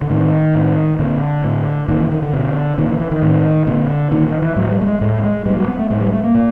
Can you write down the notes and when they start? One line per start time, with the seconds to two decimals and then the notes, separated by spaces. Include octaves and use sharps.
0.02 D3
0.10 A2 D#3
0.55 A2
0.99 A#2 D3
1.44 A2
1.88 A#2 D#3
2.00 E3
2.11 D#3
2.22 D3
2.33 B2
2.78 A#2 D#3
2.89 E3
3.00 E3
3.11 D#3
3.22 A2
3.67 A#2 D3
4.11 A#2 D#3
4.27 D#3
4.42 E3
4.56 A2 F#3
4.71 G3
4.81 A3
4.86 G#3
5.01 A2 A3
5.24 G#3
5.46 A#2 G3
5.57 F#3
5.68 B3
5.79 A3
5.90 A2 G#3
6.01 G3
6.13 A3
6.24 A#3
6.35 A#2